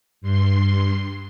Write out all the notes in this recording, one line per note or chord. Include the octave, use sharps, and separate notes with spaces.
G2 C6